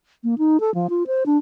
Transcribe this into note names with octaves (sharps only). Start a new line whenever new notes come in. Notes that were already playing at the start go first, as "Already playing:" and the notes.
A#3
D#4
A4
F3
F4
C5
D4